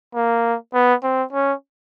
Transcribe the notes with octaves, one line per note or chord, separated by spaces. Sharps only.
A#3
B3
C4
C#4